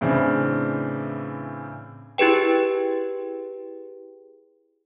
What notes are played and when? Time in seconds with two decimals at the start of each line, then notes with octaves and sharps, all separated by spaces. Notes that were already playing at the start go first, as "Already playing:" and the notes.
0.01 A2 C#3 E3 C4 D4
2.18 E4 G4 G#4 B4 G5